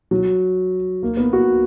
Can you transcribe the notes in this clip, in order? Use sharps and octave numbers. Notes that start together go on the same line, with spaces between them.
F#3
A#3
B3
F#4